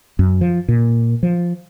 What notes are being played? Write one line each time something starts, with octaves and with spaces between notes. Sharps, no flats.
F#2
F3
A#2
F3